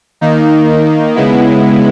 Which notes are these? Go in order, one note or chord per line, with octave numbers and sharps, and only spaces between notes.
D#3 A#3 D#4
C#3 G#3 B3 E4